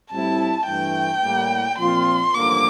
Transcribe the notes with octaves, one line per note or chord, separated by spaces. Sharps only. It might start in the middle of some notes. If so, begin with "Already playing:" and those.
A2 G3 C4 E4 A5
G2 E3 A3 G5
A2 G3 A#3
A#2 F3 C4 F4 C6
A1 G2 D3 F3 A#3 D6